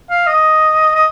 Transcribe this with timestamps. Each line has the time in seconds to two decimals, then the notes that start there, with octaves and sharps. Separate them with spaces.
0.10 F5
0.27 D#5
0.95 D#5